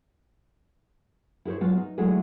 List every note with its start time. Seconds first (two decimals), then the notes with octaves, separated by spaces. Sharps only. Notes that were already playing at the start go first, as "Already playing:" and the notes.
1.45 E4 G#4 A#4 C5 C#5
1.61 F#3 G#3 B3 F4
1.77 D#4
1.98 F#3 G#3 A3 E4 G#4